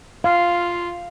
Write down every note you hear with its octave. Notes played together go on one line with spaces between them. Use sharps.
F4 F5